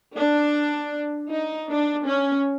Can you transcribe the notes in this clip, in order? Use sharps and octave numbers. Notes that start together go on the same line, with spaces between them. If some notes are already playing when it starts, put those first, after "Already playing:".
D4
D#4
D4
C#4